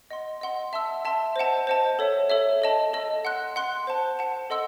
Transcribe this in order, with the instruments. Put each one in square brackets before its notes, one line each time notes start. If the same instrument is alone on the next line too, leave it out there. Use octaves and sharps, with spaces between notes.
[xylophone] D#5 F#5 C6
D#5 F#5 C6
E5 A5 C6 E6
E5 A5 C6 E6
C5 D#5 F#5 A5
C5 D#5 F#5 A5
A4 C#5 E5
A4 C#5 E5
A4 D#5 A5
A4 D#5 A5
F#5 C6 F#6
F#5 C6 F#6
C5 F#5 A5
C5 F#5 A5
A4 D#5 F#5 C6 E6